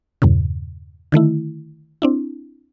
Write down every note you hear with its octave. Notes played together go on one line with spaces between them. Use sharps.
E2 G2 A#2 C#3
D3 D#3 A3 E4
C4 D4 E4